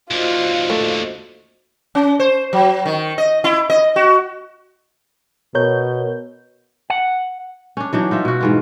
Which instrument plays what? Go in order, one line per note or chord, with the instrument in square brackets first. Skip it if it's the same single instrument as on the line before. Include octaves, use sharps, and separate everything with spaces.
[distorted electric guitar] D#2 D3 [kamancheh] F4 [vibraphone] F#4 C5 D#5
[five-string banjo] A3
[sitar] C#4
C5
F#3
D#3
D#5
E4
D#5
F#4
[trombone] B2 [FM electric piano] A#4 C#5 G6
[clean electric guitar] F#5
[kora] C#4 D4
E3 F#3 D4 D#4
D#4 F4 E5
B2 F#4
G#2 E3 F4